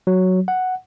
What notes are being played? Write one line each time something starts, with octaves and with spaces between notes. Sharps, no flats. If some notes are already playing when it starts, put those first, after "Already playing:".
F#3
F#5